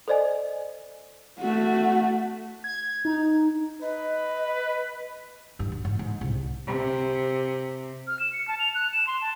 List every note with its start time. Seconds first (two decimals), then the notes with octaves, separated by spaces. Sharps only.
0.08 A4 C5 D5 D#5 G#5
1.40 A3 F#4
2.64 G#6
3.05 D#4
3.82 B4 D#5
5.59 G2 E3
5.72 F#3
5.85 G#2
5.99 G#2
6.21 C2
6.68 C3
8.08 F6
8.19 E7
8.33 C#7
8.48 A5
8.59 F7
8.75 F#6
8.92 E7
9.07 C6
9.21 A5